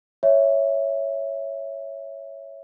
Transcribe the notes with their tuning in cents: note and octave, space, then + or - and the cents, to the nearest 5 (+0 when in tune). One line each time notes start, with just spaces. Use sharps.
C#5 +0 E5 +0